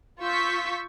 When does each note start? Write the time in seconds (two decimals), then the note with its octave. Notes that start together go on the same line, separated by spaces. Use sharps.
0.21 F4 C#6 E6 G6 B6